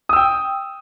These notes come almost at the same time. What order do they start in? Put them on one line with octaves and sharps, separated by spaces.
D#6 E6 G5